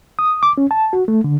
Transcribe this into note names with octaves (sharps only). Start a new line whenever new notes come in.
D#6
D6
C#4
A5
F#4
A3
D3